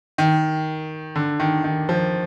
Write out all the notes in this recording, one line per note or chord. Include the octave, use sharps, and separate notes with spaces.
D#3
D3
D#3
D#3
F3